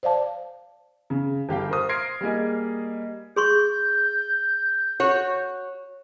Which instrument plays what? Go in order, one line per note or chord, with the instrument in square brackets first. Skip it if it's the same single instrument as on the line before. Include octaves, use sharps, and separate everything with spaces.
[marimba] C5 D5 F5 A5
[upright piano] C#3
G1 G4 F5 G5
A#4 C5 F5 D#6
C6 F6 G#6 A#6 C7 D7
G3 A#3 G#4 D#5
[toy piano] G#4 C6 C#6 [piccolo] G6
[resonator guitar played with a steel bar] F#4 C#5